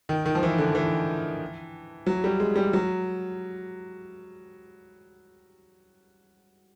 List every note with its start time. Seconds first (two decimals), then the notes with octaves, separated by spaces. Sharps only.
0.09 D#3
0.26 D#3
0.35 F3
0.43 E3
0.58 D3
0.75 E3
2.07 F#3
2.24 G3
2.40 G#3
2.56 G3
2.73 F#3